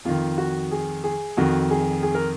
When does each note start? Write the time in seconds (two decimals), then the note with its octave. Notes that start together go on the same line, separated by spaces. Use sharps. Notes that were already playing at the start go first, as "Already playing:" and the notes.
0.05 F2 D#3 F4
0.38 F#4
0.72 G#4
1.04 G#4
1.37 F2 D#3 F#4
1.70 G#4
2.03 G#4
2.15 A#4